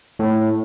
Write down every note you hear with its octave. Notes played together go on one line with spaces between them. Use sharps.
A2